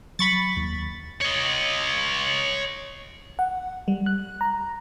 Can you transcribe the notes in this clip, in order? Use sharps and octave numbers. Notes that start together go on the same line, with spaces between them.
F#3 B5 C#6 A6
D#2
C#5 D#5
F#5
G3
F#6
A#5